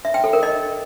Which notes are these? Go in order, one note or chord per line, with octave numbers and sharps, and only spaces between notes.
E5
G5
A4
A#4
D#5